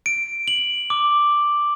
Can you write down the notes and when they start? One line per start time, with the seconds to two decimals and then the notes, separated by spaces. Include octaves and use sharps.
0.06 D7
0.48 F#7
0.90 D6